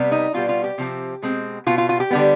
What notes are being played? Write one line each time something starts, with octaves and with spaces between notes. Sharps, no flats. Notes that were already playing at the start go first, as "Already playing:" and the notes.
Already playing: C3 G3 B3
D#4
B2 G3 B3 F4
F4
G4
C3 F3 C4
B2 G#3 C4
B2 B3 F4
F4
F4
G4
D3 G3 B3